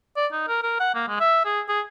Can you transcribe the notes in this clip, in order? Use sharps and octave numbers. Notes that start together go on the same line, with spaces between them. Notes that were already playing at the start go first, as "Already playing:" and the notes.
D5
D#4
A#4
A#4
F#5
A#3
G#3
E5
G#4
G#4